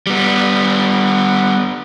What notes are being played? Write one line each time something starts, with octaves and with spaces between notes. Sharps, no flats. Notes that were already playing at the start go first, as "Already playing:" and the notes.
G3 B3